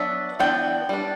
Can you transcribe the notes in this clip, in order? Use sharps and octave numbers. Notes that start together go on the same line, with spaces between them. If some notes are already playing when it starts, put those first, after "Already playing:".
Already playing: F#3 B3 D4 E5
E3 B3 D4 G5
G3 D4